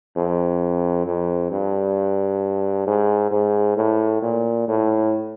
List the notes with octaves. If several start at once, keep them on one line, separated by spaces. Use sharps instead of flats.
F2
F2
G2
G#2
G#2
A2
A#2
A2